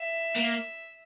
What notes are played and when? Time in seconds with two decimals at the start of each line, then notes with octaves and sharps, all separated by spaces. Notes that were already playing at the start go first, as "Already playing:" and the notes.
Already playing: E5
0.36 A#3